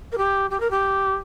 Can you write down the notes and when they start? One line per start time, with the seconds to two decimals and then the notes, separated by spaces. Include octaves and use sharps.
0.12 A#4
0.18 G4
0.51 G4
0.60 A#4
0.71 G4